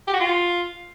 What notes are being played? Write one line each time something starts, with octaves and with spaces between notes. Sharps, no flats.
G4
F#4
F4